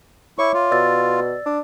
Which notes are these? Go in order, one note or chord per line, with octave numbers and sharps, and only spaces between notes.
E4 C#5 E5 C#6 D6
F4
B2 D5 E6 A6
D4